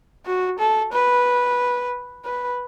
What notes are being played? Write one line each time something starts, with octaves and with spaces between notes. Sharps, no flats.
F#4
A4
B4
B4